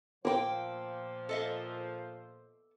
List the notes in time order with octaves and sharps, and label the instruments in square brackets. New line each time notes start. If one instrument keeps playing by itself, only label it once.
[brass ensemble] A#2 F3 C5 [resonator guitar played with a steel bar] A#3 G5 [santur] D6 E6
[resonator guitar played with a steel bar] A4 D#5 E5